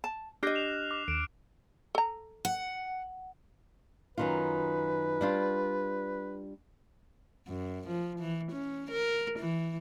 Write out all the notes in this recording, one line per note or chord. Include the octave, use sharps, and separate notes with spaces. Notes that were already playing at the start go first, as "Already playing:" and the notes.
A5
D4 G4 D#5 F6 F#6 A#6 C7
E7 F7
D6
D#2 D7 F7
A4 A#5
F#5
F#2 D#3 F4 B4
G3 D4 F4
F#2
F3
E3
C#4
A#4
E3